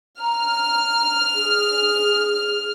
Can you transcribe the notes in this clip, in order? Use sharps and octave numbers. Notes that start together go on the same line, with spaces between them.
A#5 F6
G#4